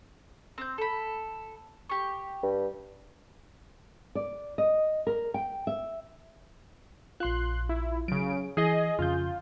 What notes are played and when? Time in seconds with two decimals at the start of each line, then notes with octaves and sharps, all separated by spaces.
0.58 C4 G6
0.78 A4 B5
1.89 G4 C#6
2.43 G2
4.15 D5
4.58 D#5
5.07 A#4
5.34 G5
5.67 E5
7.20 A#1 F4 C6 F#6
7.69 E4
8.08 C#3 F#3 D7
8.57 E3 G#4 D#5 C7
8.99 F2 C#3 F4 G6